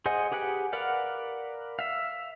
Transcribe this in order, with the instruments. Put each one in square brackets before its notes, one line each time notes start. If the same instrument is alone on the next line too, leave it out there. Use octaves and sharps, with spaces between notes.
[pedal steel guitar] G#4 C5 D#5 F#5 G#5
G4 G#4 B4 F#5 G5
A#4 B4 D5 F5 F#5
E5 F5